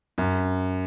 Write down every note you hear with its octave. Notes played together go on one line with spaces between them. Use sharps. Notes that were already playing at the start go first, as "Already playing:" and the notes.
F#2